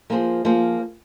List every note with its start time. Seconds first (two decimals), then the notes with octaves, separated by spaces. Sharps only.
0.10 F3 A#3 F4 G#4 C5
0.45 F3 A#3 F4 G#4 C5